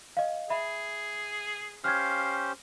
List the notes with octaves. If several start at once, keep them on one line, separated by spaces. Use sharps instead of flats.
D#5 F5
G#4 E5 B5
C#4 G4 C5 F5 F6 G#6